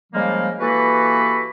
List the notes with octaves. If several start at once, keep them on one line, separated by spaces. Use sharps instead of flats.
C#3 F3 G3 G#3 A#3
E3 A#3 F#4 G4 A4 B4